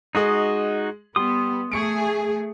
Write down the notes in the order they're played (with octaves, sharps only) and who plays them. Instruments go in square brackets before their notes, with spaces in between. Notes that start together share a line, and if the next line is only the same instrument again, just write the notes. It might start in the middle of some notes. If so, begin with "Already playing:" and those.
[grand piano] G#3 G#4 [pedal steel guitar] D#4 F#4 D#5
[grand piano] G3 [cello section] B3 [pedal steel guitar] C6 D#6
[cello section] A3 G#4 [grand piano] C#6 C#7 D7